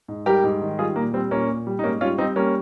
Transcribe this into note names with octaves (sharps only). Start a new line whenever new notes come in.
G#2
G3 G4 A#4
G#2
D#3
G3 F4 G#4
A#2 A#3
G3 C4
A#2 A#3 C#4
A#2
G3
D#4
G#2 A#3 C#4
G3 C#4 F4
G3 C4 D#4
G3 A#3 C#4